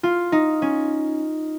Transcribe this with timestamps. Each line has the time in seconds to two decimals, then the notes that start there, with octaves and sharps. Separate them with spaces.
0.03 F4
0.32 D#4
0.62 C#4